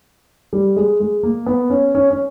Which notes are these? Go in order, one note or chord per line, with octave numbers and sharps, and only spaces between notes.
G3
G#3
G#3
A#3
B3
C#4
C#4
C#4